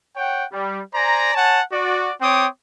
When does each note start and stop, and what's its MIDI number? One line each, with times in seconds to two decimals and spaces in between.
0.16 0.44 73
0.16 0.44 78
0.16 0.44 79
0.52 0.81 55
0.94 1.33 72
0.94 1.33 74
0.94 1.33 80
0.94 1.33 82
1.34 1.61 73
1.34 1.61 78
1.34 1.61 80
1.34 1.61 81
1.72 2.12 66
1.72 2.12 74
2.21 2.47 60
2.21 2.47 73
2.21 2.47 79
2.21 2.47 86
2.21 2.47 87